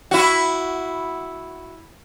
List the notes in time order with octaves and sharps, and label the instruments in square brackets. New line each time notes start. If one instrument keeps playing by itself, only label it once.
[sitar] E4 F#4